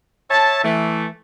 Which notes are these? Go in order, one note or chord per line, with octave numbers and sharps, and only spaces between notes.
C#5 E5 A5
E3 A3